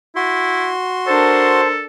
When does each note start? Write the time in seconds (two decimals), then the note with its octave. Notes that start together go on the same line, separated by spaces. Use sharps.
0.16 E4 F#4 C6
1.07 D4 A4 A#4 C5